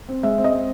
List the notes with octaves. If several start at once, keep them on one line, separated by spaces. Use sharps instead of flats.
C4
G#3 E5
C4
D#5
C4